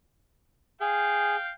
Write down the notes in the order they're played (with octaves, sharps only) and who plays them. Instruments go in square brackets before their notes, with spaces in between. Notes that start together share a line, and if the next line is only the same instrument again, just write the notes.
[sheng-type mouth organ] G#4 [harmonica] F5 G5